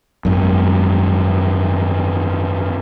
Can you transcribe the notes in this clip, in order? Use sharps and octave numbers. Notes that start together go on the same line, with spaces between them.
G#1 F#2